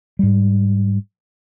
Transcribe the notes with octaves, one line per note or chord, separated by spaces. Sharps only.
G#2 G3